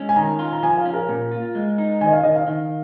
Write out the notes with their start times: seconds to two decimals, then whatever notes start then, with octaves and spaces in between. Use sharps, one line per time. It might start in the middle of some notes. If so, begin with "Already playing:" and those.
Already playing: G#3 C#4
0.09 G#5
0.16 D#3 A#5
0.39 F4
0.53 A#5
0.63 F3 G#5
0.77 F5
0.86 C#4
0.93 A#4
1.09 A#2
1.32 F4
1.55 G#3
1.78 D#4
2.01 D#3 G#5
2.06 D#5
2.13 F5
2.23 D#3 D#5
2.36 F5
2.48 D#3